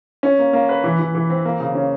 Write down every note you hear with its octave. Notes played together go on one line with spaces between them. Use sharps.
C#4
A#3
A#3
B4
E3
E3
E3
C4
A#3
C#3
C#4